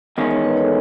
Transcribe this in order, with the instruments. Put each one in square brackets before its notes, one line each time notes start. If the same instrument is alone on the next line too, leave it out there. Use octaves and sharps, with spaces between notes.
[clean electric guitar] E2 D#3 G#3 C#4 [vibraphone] D#5
[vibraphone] C#5
B4
A4 C#5